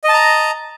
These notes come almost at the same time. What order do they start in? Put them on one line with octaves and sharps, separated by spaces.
D#5 A5 A#5